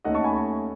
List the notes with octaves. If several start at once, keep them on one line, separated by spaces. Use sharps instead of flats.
D#2 D#3 A3 C#4 D#5 F#5
A5 C#6
G#5 B5